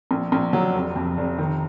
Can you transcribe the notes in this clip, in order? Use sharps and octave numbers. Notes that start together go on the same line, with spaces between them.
A#1
A#1
F#3
F1
F2
F1
D#3